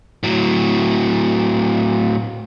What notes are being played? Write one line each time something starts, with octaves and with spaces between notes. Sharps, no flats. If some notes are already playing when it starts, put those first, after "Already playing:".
A2 F#3